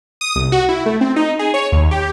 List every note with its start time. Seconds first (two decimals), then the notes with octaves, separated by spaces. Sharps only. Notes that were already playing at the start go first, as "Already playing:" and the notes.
0.21 D#6
0.36 C2
0.52 F#4
0.69 E4
0.86 A3
1.01 C4
1.16 D#4
1.39 G#4
1.54 C#5
1.72 D#2
1.91 G4